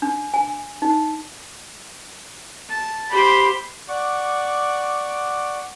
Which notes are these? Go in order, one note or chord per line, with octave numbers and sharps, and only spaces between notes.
D4
G#5
D#4
A5
G4 C5 B5
D5 F#5 C#6 D6